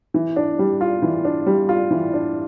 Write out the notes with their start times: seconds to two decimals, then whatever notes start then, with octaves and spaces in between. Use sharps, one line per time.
0.14 E3
0.36 D4
0.59 G3
0.81 F4
1.02 E3
1.25 D4
1.47 G3
1.69 F4
1.91 E3
2.13 D4